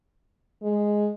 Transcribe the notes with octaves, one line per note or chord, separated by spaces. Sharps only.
G#3